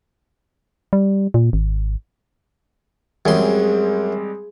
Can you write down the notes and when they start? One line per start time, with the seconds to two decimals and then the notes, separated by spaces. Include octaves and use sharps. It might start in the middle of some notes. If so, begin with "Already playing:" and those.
0.93 G3
1.34 A#2
1.53 G#1
3.26 F#2 G3 G#3 C4 G#4 C6